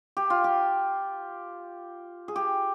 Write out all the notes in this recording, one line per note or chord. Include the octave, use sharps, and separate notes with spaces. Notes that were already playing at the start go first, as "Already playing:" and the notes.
G4
F4
G4
G#4
G4